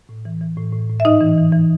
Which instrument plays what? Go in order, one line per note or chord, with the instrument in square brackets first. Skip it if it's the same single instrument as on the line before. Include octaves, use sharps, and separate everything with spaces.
[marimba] A2
E3
E3
A2
A2
A2
E5
G#2 D#4 D#5
E3
E3
E3